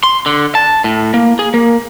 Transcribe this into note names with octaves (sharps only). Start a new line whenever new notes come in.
C6
D3
A5
A2
A#3
G#4
A#3